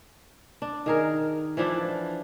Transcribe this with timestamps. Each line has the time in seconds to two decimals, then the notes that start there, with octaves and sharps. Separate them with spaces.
0.62 D4
0.86 D#3 G#4 A#4
1.57 E3 F3 D4 E4